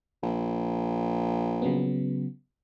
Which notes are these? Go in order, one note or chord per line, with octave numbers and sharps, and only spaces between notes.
A#1
C#3 F#3 B3